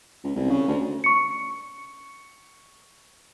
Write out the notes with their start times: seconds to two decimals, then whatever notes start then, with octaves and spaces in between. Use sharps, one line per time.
0.24 C#2
0.36 C2
0.50 C#3
0.68 D2
1.04 C#6 C#7